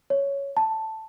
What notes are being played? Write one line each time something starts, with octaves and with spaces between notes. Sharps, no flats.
C#5
A5